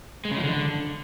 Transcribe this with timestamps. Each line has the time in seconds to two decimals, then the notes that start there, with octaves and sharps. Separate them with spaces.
0.25 G#3
0.31 C#3
0.38 F3
0.44 D3